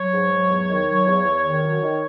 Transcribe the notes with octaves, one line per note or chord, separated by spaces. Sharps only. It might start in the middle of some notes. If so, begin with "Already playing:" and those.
Already playing: F#3 C#5
G#2
F#3
E2
D#3
F#3
E2
E2
D#3
F#2
D#3